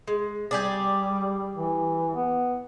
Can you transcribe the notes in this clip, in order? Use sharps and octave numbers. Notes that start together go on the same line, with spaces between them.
G#3
G3 G4 G#4 D5
E3
B3